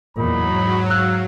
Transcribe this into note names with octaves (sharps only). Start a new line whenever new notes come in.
E2 A#2 F#3 D#4 B5
G#2
F5 E6 F#6